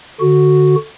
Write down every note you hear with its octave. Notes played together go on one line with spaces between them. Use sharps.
D3 F#4